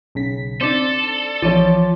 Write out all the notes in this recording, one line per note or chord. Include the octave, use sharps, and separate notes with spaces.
B1 C#3 B6
C4 D4 D#4 A4 C5 D5 A6
A#1 E3 F3 C#5 D6 A6 D#7